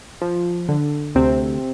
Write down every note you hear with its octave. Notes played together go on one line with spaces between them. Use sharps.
F3
D3
D2 C3 C4